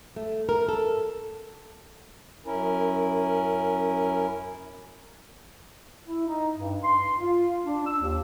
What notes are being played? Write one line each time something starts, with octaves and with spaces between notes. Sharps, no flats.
A3
A#4
A4
F#2 C#4 E4 A#4
E4
D#4
G2
C6
F4
D4
E6
D#2